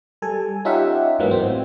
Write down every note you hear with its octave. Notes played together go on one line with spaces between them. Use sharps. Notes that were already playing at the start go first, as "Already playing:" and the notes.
G3 A4 G#5
C#4 D#4 F4 G4 E5 F#5
G#2 E3 F#3 A#3 B3
A2 C4